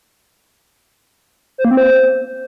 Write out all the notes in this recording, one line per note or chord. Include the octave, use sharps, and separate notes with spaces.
C5
A#3
C4
C5